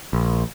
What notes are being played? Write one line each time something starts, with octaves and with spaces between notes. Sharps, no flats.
A#1